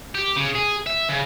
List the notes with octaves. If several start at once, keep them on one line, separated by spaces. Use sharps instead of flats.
G4
C#3
G#4
E5
C#3